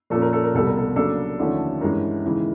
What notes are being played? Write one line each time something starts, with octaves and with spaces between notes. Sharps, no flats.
A#2 F3 A#3 C#4 A4
A#4
A4
A#4
C2 B2 G3 A4
A#4
A4
C#3 F#3 A#3 D4 A4
D#2 D3 F3 A3 C#4
G2 E3 G#3 C#4 A#4
D#2 C#3 E3 G#3